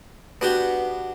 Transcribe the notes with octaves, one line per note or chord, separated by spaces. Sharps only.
B3 D4 F#4 G4